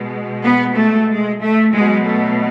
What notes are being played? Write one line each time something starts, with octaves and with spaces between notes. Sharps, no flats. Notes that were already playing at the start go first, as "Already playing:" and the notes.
Already playing: B2 G#3
B3
A3
G#3
A3
B2 F#3 G#3
A3